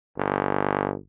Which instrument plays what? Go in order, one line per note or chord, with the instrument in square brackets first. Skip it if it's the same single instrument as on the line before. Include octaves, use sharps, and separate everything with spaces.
[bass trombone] G1